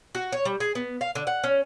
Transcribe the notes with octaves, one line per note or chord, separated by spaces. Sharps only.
F#4
C#5
G3
G#4
B3
F5
D3
F#5
C#4